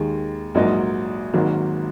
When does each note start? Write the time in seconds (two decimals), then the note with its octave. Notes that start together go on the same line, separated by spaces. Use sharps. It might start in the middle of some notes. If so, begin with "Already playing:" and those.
Already playing: D#2 D#3 G#3
0.55 A#1 G#2 F#3 A#3 D#4
1.34 G#1 G#2 D#3 F#3 A#3